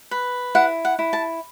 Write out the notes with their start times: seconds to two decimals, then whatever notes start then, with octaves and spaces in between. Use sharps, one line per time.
0.11 B4
0.55 E4 F#5
0.85 F#5
0.99 E4
1.13 A5